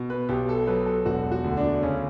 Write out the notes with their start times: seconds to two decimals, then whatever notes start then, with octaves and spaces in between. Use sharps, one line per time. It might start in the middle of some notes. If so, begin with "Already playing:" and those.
Already playing: B2
0.10 B4
0.29 B1 G4
0.49 A4
0.67 F#3 B4
0.86 A4
1.06 E1 F#4
1.32 F#4
1.44 D2
1.57 D4
1.83 C#3 C#4